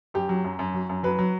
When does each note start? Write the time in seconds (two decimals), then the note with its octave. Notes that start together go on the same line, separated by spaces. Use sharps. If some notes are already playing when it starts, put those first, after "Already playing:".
0.14 F#2 G4
0.29 F#3
0.44 F#2
0.59 F#2
0.74 F#3
0.89 F#2
1.03 F#3 B4
1.19 F#3